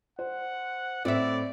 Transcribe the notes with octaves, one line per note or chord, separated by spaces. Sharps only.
C5 F#5
A2 C4 D5 E5